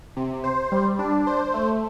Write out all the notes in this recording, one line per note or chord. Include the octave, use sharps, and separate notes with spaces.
C3
C5
G3
D4
C5
A3